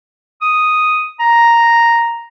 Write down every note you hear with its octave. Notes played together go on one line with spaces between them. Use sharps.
D#6
A#5